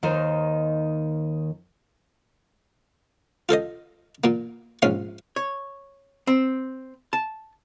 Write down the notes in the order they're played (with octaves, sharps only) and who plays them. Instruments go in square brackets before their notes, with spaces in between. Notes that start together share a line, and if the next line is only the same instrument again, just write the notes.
[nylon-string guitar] D#2 D#3 D#4 C5
[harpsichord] F4 A4 C5 D#5
A#2 A#3
A#1 G#2 C#4 F4 G#5 C6
[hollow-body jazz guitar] C#5
C4
A5